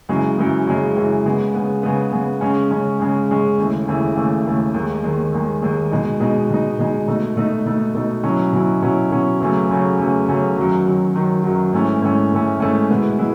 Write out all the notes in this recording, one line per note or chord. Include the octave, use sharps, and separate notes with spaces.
F#2 C#3 E3 G#3
F#2 C#3 E3 G#3
F#2 C#3 E3 G#3
F#2 C#3 E3 G#3
C#3 G#3 B3
C#3 G#3 B3
C#3 G#3 B3
C#3 G#3 B3
C#3 G#3 C#4
C#3 G#3 C#4
C#3 G#3 C#4
C#3 G#3 C#4
D#2 C#3 E3 A3
D#2 C#3 E3 A3
D#2 C#3 E3 A3
D#2 C#3 E3 A3
D#2 D#3 G#3
D#2 D#3 G#3
D#2 D#3 G#3
D#2 D#3 G#3
B2 G#3 D#4
B2 G#3 D#4
B2 G#3 D#4
B2 G#3 D#4
B2 A3 D#4
B2 A3 D#4
B2 A3 D#4
B2 A3 D#4
B2 F#3 C#4 E4
B2 F#3 C#4 E4
B2 F#3 C#4 E4
B2 F#3 C#4 E4
E2 C#3 F#3 A3 C#4
E2 C#3 F#3 A3 C#4
E2 C#3 F#3 A3 C#4
E2 C#3 F#3 A3 C#4
F#2 D#3 F#3
F#2 D#3 F#3
F#2 D#3 F#3
F#2 D#3 F#3
G#2 E3 A3 C#4
G#2 E3 A3 C#4
G#2 E3 A3 C#4
G#2 E3 A3 C#4
B2 G#3 B3 E4
G#3 B3 E4